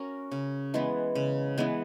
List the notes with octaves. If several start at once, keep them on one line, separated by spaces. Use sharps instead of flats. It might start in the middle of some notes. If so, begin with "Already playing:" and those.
Already playing: C#4 F#4 A#4
C#3
E3 G#3 B3
C#3
E3 G#3 B3